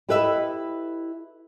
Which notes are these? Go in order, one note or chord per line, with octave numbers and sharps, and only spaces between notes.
E4 G4 A4 B4 D#5 E5